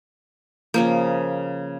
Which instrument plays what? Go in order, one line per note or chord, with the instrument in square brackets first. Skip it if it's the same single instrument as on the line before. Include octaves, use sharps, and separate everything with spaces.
[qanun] C#3 F3 A#3